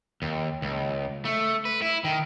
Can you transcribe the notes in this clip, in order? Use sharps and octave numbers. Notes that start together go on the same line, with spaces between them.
D#2
C#2
A3
B4
E4
D#3